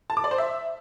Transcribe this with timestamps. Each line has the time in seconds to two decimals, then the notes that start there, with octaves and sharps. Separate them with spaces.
0.10 A5
0.17 D6
0.24 D5
0.31 C5
0.38 E5